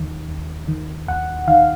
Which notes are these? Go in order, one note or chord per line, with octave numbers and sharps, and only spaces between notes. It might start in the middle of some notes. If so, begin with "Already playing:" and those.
Already playing: D#2 D#3
D#2
D#3
D#2 F#5
D#3 F5